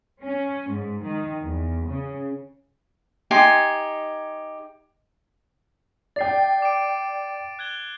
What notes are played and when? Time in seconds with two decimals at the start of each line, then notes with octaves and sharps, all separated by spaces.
0.23 C#4
0.72 G#2
1.03 D#3
1.43 E2
1.86 C#3
3.31 D#4 G4 G#5 C6
6.16 D5 G5 A6 C7
6.62 D6 D7
7.59 F#6 G#6 G7